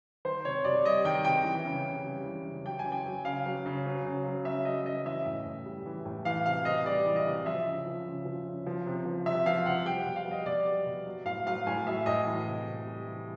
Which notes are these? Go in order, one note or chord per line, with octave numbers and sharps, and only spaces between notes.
D#3 C5
C3 C#5
C3 D5
G3 D#5
D#3 G5
C3 G5
E3
C#3
C#3
G3
E3
C#3
F#3 G5
G#5
C#3
G5
F#3
C#3 F5
F#3
C#3
F#3
C#3
F#3
C#3 E5
F#3 D#5
C#3 D#5
E3 E5
A2
A2
G3
E3
A2
E3 F5
C3 F5
C3 D#5
G3 D5
E3
D#5
C3
F3 E5
C#3
F3
C#3
F3
C#3
F3
C3
F3
C3 E5
F3 F5
C3 F#5
G3 G5
B2 F#5
F5
G3 D#5
B2 D5
G3
B2
F#3
A2 F5
F#3 F5
A2 G#5
F#3 E5
A2 D#5
E3
C3
C3
G3
E3